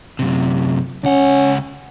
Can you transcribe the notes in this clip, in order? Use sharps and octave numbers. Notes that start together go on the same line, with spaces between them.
F#2 C3
C#2 C#4 F#5